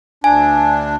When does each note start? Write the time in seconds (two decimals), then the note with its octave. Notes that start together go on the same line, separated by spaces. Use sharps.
0.24 D2 D4 G#5